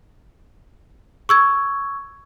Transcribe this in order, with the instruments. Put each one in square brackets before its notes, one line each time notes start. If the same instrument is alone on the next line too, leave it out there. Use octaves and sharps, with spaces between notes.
[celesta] C#6 E6 G#6